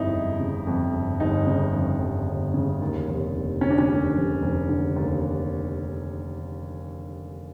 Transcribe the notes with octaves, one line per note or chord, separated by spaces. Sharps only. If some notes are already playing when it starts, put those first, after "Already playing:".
Already playing: G1 F2 D#4 E4
G1
C#3
F2
G1
G1 D#4
C#3
F2
G1
G1
C#3
D#2
F1
F1
D3 C#4
D4
C#4
D#2
F1
F1
D3
D#2